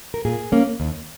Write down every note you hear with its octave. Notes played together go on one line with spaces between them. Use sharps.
A#4
A#2 G#4
A#3 C#4
D#2